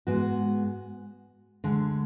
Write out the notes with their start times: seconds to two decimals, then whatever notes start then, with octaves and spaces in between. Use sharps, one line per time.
0.07 G#2 G#3 B3 F#4
1.64 D2 D3 G#3